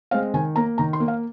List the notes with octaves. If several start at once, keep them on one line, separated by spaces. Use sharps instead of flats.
G#3 C4 F5
D#3 G#5
A#3 A#5
D#3 A#5
C6
A#3
F5